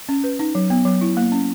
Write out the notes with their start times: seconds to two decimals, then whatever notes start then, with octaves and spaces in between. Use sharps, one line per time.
0.09 C#4
0.24 B4
0.39 D#4
0.55 F#3
0.70 B3
0.85 F#3
1.01 E4
1.17 A#3
1.32 C#4